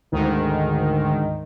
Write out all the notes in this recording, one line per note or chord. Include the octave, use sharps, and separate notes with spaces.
D2 G#2 D#3